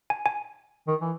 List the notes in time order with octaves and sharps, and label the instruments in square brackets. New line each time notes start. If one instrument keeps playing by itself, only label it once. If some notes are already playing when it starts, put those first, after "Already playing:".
[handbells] G#5
G#5
[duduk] D#3
E3